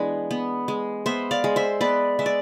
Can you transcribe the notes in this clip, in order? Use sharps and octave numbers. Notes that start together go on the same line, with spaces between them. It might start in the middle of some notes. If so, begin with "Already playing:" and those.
Already playing: E3 G#3 B3 D4 B4 D5
B3
G#3
B3 C5 E5
D5 F5
G#3
C5 E5
B3 B4 D5
G#3 E5
D5